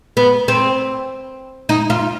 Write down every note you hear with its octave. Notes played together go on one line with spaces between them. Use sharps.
B3
C4
D#4
F4